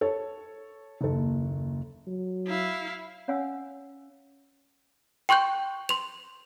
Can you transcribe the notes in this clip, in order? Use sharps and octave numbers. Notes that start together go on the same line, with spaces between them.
A4 C#5
F#1 D#2 A4
F#3
E4 F5
C#4 C#5 F5 F#5 G#5 E6
G5 C6 C#6 F#6 G6
C6 F7